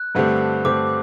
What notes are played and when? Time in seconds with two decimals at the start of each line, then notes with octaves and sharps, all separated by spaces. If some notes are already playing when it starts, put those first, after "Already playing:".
Already playing: F#6
0.15 G2 D3 A3 C4 G4
0.65 G2 D3 A3 C4 G4 D6